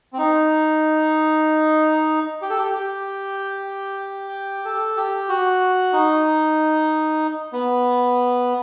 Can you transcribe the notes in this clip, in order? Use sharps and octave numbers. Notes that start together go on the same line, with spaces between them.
C4
D#4
G4
A4
G4
G4
A4
G4
F#4
D#4
B3